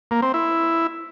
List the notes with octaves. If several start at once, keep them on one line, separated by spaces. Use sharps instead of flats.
A#3
C4
E4